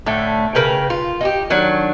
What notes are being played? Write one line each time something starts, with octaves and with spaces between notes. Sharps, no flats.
A2 D3 A3
C#3 A#4 B4 G5
F4
D#4 F#4 G4
D#3 F#3 D4